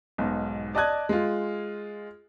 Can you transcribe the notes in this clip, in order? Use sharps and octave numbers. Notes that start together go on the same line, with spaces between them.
B1 G#2 B2
D5 D#5 A5 D#6 F#6 G#6
G#3 F4